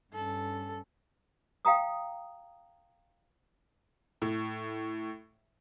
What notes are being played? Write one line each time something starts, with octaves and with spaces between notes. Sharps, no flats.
G2 C#4 A4
F5 G5 A#5 D#6
A2